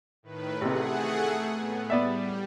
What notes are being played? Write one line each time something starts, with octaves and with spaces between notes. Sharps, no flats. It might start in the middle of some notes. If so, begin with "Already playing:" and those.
A2 D#3 B4
A1 C3 A3 G#4 F#5
A2 B3
G3 B3 D5 E5